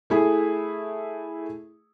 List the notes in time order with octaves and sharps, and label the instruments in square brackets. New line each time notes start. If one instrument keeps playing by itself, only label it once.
[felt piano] A3 E4 G#4